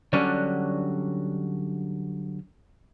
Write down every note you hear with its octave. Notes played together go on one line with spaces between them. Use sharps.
D3 F#3 G3 C#4 D4